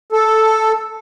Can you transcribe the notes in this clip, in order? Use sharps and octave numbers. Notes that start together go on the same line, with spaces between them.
A4